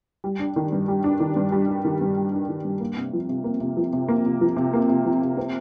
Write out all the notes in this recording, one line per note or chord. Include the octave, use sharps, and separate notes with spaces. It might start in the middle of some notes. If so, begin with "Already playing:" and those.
G3
D4
D#3
G2
G3
D4
D#3
G2
G3
D4
D#3
G2
G3
D4
D#3
G2
A#3
C3
F3
C3
A#3
C3
F3
C3
A#3
C3
F3
C3
A#3
C3
F3
C3
C4